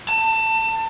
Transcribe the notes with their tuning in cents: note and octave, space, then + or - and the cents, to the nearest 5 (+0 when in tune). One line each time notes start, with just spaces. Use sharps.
A5 +25